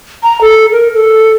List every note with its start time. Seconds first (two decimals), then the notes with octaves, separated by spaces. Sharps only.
0.23 A#5
0.41 A4
0.72 A#4
0.94 A4